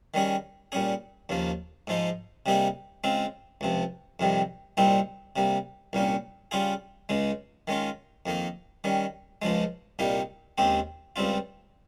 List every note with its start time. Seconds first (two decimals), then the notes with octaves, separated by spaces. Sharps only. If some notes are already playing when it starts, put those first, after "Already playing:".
0.14 D#3 G3 C#4 G#4
0.72 A#2 G3 C#4 G#4
1.29 D#2 C#3 F3 A#3
1.87 G#2 F3 G#3 D#4
2.46 C3 G3 A#3 D#4 G#4
3.04 C#3 G#3 C4 F4
3.61 C#2 C3 F3
4.20 F2 C3 D#3 G3
4.77 C2 A#2 G3 C4 D#4
5.36 C3 G3 A#3
5.93 C2 A#2 G3 A#3 C#4
6.51 C#3 G3 C#4 F4 G#4
7.09 C#2 C#3 G#3
7.67 D#3 G#3 C#4 F4
8.26 F2 D#3 A#3 D#4
8.84 D#3 G3 C#4
9.42 C#2 C#3 F3 G#3
9.99 C2 A#2 G3 A#3 D#4
10.58 D#2 C#3 G#3 C4 G4
11.16 C#2 C#3 G3 C4 F4